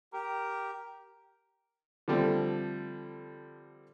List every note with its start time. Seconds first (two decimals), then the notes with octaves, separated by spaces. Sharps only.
0.13 G4 A#4
2.08 D3 F3 G3 A3 C4